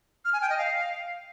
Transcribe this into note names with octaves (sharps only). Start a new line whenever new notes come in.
F6
G#5
G5
D#5
F5